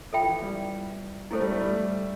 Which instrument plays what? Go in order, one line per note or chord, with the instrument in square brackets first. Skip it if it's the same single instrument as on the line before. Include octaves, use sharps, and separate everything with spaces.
[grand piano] F3 [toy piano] A4 E5 G5 B5
[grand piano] E3
G3
[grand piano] A3 [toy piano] E4 A4 C5
[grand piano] G3
A3
G3